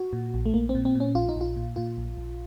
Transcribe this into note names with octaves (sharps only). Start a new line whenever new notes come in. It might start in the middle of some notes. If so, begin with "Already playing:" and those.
Already playing: F#4
A#2
A#1
A3
A#1 A#3
C4
A#2
C4
A#2 C#4
A#1 F4
D#4
A#1
F4
A#2
A#2 F4
A#1
A#1